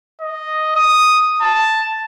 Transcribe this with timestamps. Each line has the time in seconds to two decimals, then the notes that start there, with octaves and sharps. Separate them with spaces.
0.21 D#5
0.76 D#6
1.41 A5